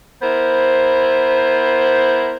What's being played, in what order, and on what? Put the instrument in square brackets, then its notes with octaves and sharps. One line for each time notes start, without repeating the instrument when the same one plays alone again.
[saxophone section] B3 E4 A#4 C5